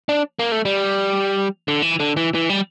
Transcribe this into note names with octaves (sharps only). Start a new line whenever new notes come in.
D4
A#3
A3
G3
D3
E3
D3
E3
E3
G3